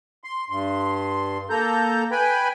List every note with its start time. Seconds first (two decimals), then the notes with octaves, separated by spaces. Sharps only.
0.24 C6
0.50 G2 C6
1.50 A#3 A4 A#5 G6
2.11 B4 G5 G#5 B5